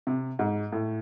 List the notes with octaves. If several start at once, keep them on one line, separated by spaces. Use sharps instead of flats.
C3
G#2
A2